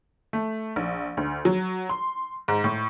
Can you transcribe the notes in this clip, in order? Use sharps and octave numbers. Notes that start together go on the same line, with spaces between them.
A3
A#1
D2
F#3
C6
G#2
A2